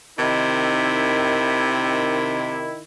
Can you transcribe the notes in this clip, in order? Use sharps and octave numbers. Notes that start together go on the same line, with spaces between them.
C3 D#3 E4